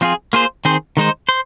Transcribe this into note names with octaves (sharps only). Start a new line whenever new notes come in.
F3 C4 F4 G#4
A#3 F4 G#4 C5
D#3 C4 G#4 C5
D#3 G#3 D#4 C5
C5